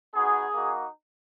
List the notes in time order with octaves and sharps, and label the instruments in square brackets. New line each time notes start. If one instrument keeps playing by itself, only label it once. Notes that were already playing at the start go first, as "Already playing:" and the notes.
[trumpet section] B3 D#4 F#4 G#4
A#3 D#4 F#4